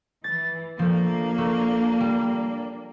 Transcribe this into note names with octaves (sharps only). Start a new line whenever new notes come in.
E3 A6
F3 A3 A#3 D4
A3
G3